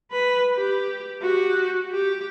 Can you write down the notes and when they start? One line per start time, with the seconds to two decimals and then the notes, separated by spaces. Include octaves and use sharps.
0.12 B4 B5
0.57 G4
1.22 F#4 G4
1.93 G4